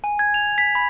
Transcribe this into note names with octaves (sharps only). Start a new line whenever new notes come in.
G#5
G#6
F7
B6
B5